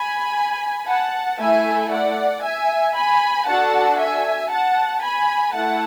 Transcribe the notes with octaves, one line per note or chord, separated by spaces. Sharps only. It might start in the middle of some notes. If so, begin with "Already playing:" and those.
Already playing: G#5 B5
F#5 A5
A3 E4 A4 E5 G#5
D5 F#5
E5 G#5
G#5 B5
D4 F#4 A4 F#5 A5
E5 G#5
F#5 A5
G#5 B5
A3 E4 F#5 A5